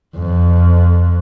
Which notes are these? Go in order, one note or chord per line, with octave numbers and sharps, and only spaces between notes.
F2